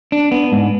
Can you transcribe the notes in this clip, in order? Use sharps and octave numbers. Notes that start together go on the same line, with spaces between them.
D4
B3
G#2